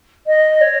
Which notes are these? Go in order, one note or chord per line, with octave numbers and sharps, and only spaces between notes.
D#5
C#5